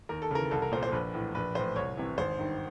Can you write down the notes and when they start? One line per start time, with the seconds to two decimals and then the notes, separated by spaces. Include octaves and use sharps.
0.09 D#2 A#4
0.22 A4
0.31 C#3 E3 A#4
0.51 C2 A4
0.62 A#4
0.72 A#2 C5
0.83 C5
0.92 A#1 B4
1.14 A2 E3
1.35 A#1 B4
1.55 A2 E3 C5
1.76 C2 C#5
1.97 C3 E3
2.18 G#1 C5
2.39 G2 D#3